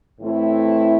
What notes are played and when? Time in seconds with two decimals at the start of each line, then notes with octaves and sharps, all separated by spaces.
0.20 A2 E3 A3 C4 E4